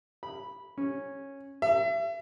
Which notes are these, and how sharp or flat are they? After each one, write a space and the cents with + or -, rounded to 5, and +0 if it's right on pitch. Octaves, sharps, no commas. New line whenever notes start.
B5 -10
C#4 -10
E5 +35